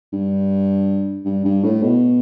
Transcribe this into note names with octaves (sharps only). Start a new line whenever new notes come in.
G2
G2
G2
A2
B2